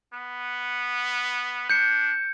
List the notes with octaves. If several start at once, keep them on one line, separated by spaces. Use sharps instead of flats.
B3
D4 G6 C#7